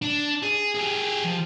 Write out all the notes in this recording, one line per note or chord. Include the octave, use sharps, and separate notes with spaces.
D4
G#4
G4 G#4
F3